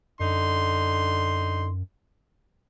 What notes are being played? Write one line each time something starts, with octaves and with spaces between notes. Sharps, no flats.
F#2 D3 D#4 C6